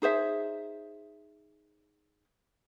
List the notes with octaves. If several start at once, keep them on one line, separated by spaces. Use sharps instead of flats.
D#4 G#4 C5 E5